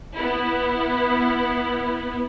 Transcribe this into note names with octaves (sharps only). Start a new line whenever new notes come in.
B3 E4